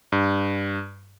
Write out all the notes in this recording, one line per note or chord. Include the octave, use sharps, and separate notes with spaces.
G2